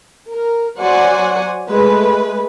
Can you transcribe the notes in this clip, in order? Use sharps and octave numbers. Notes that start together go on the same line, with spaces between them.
A#4
F#3 F#4 C5 D5 F#5 G#5
G#3 A3 B4